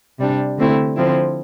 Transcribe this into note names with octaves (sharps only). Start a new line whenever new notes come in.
C3 G3 D4
D3 A3 C4 E4
D3 F3 C4 E4